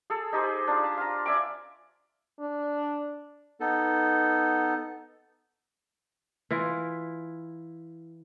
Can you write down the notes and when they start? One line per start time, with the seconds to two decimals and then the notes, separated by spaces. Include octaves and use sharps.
0.10 G#4 A4
0.33 D#4 G4 G#4 C5
0.68 D4 F4
0.83 A5
0.97 F4 A#5
1.26 D5 E5 G#5 D6
2.40 D4
3.60 B3 D#4 A4
6.50 E3 E4 F4